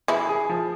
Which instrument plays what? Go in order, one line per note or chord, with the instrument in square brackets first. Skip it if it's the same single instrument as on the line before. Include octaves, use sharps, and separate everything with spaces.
[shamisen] E3 E4 [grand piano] G#4
[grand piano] G#4
F3